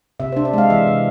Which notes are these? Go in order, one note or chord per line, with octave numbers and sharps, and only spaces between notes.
C3 E5
C5
D4
E5
G#3 F5
E3 E5
C3